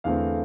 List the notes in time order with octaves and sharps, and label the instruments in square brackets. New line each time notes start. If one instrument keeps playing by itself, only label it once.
[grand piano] E2 D3 A3 C4 F5